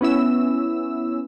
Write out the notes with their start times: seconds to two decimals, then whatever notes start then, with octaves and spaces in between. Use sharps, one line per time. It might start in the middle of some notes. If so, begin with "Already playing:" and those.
0.01 B3 C#4 E4 E6